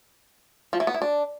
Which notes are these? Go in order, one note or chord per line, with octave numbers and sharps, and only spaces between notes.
F3
E3
B3
E4
D4